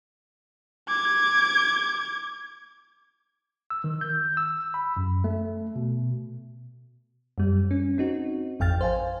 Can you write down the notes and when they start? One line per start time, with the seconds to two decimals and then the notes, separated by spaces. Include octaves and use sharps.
0.88 D6 G#6
3.70 E6
3.84 D#3
4.01 G6
4.37 E6
4.74 B5
4.97 F#2
5.24 A3
5.76 B2
7.38 F#2 G3
7.71 C#4
7.98 C4 D#4 F#4
8.60 A1 F2 G5 F6 A6
8.81 C5 F5 G#5